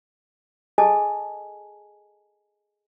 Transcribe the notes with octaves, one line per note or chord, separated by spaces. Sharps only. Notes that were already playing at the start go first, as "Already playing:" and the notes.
G#4 A4 D#5 G#5 A5